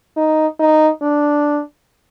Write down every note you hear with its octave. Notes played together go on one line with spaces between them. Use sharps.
D#4
D#4
D4